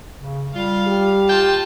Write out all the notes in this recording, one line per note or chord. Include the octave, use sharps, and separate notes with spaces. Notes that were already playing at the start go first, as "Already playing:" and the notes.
C#3
G3 F4 F5
G4
F4 G5 A5